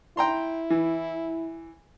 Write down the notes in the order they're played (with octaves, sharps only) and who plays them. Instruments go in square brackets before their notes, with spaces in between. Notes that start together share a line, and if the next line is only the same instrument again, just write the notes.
[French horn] E4 [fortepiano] G5 A#5 C6
[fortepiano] E3